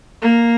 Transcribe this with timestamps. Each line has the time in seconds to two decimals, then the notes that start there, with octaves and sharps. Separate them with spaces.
0.22 A#3